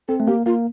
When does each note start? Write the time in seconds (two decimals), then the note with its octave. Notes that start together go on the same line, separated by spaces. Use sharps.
0.08 C4 A4
0.20 A3
0.27 A#3 G4
0.46 A#3 F4